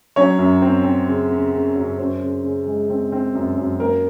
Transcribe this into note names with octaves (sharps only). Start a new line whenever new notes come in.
F#3 C#4 C#5
F#2
C4
C4
C#3
C#3
C#3
F#2
F#2 C5
C#3
C#3
G#3
C4
C4
F#2
F#2
A#3 A#4